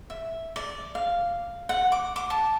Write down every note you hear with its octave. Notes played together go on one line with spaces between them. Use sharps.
E5
D5
F5
F#5
D6
D6
A5